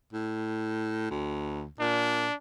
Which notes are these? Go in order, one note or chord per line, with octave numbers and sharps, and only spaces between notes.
A2
D2
A#2 D4